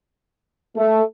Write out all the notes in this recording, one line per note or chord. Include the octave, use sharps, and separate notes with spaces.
A3